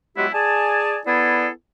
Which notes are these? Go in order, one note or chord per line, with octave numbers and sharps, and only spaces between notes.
F#3 G#3 B3 E4 G4
G#4 D5 G#5 A5
B3 E4 G#4 A4 D5